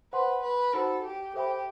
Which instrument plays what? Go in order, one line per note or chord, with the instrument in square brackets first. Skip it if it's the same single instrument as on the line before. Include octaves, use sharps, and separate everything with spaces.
[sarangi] B4 [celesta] C5 F#5 C6
[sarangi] B4
[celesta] D#4 F#4 C5 F#5 B5 [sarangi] A4
[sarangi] G4
[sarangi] G4 [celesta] A4 C5 E5 G5 B5